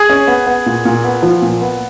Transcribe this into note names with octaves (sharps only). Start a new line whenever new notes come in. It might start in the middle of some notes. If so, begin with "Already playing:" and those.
Already playing: G#4
C#4
B3
B3
A#2
A#2
B3
F3
A#2
B3